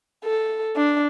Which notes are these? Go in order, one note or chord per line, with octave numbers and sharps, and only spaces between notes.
A4
D4